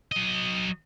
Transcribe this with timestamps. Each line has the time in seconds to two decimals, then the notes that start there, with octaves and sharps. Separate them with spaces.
0.12 F#3 D#5